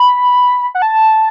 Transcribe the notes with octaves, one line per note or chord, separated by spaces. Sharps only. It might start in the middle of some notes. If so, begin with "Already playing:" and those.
Already playing: B5
F#5
A5